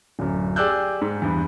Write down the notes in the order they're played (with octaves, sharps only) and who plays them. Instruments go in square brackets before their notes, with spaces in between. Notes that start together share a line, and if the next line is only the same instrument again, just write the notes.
[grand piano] D1 F#2
G4 G#4 D5 E6 F#6 G6
G#2
E2 G2